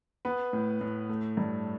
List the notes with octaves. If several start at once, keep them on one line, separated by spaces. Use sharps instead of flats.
B3 B4
A2
A2
A3
G2